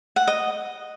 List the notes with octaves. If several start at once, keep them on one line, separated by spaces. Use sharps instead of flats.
F#5
D#5